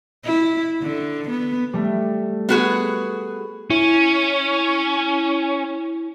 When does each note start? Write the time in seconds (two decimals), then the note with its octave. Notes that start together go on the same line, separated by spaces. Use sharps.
0.24 E4
0.82 D3
1.30 B3
1.73 G3 A3
2.49 B3 F#4 G#4
3.70 C#4 E4